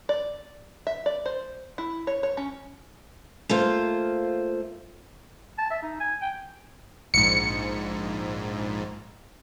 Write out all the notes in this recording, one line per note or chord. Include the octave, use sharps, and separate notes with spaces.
D5
E5
D5
C5
E4
C#5
C#5
C#4
A3 A#3 F4 C5
A5
E5
D#4
G#5
G5
A#1 G#2 C#7